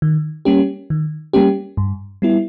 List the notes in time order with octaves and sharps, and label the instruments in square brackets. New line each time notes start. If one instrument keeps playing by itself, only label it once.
[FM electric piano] D#3
G3 A#3 C#4 G4
D#3
G3 A#3 C#4 G4
G2
G3 B3 E4